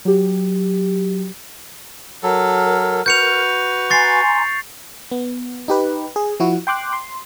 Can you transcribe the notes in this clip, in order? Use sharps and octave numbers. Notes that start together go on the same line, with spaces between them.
F#3 G4
F#3 A4 A#4 F6
F#4 B4 G6 C#7 F7
G#5 A#5 C6 C#6 A6 C7
B3
D#4 G4 B4
G#4
F3 E4 F#4
G5 C6 D6 F#6
C6